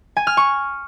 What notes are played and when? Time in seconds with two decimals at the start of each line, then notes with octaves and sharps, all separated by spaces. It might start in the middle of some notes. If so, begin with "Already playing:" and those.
0.17 G#5
0.27 F6
0.37 C#6